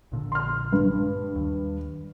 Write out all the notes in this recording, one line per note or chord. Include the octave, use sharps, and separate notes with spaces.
A#1 A#2 D3
C6 F6
G2
D#2